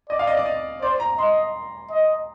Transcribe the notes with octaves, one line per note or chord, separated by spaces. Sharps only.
D5 D#5
F5
D#5
D5
D#5
C5 D5
A#5
D#5 C6
D#5